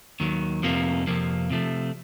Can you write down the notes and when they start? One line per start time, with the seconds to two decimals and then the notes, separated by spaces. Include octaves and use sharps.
0.20 D#2 D#3 F#3
0.63 F2 C3 F3 A#3
1.07 F2 C3 F3 A#3
1.50 C3 F3 A3